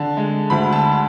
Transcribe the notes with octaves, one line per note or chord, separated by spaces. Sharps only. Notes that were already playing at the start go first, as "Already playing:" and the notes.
Already playing: D3 A5
G#3
D2 B5
A5